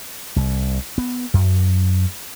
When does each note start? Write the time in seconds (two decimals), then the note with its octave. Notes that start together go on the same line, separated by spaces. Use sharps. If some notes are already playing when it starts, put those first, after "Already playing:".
0.36 C2
0.98 B3
1.34 F#2